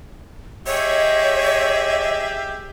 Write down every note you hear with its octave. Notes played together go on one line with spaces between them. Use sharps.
G4 G#4 C#5 D#5 E5